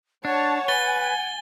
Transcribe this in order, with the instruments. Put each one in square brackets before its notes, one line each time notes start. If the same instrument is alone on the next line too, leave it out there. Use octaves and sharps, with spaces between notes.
[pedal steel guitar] D4 [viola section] C#5 A5 [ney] F#5
[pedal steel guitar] B4 [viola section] G#5 [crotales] A6 G7